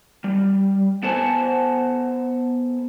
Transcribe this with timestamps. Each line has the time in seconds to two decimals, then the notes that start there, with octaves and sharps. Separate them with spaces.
0.24 G3
1.03 B3 A4 C5 F#5 G#5 A5